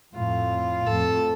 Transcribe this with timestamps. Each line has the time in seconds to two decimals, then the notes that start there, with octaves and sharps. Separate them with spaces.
0.15 F2 A2 F4
0.87 F2 A2 A4